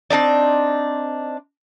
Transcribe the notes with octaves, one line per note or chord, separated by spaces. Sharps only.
C4 D4 D#4 D5